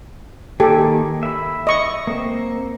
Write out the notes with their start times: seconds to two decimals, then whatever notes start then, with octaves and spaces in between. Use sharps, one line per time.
0.60 D#3 A#3 G4 A4 G#5
1.23 E5 B5
1.67 D#5 C#6
2.07 A#3 C4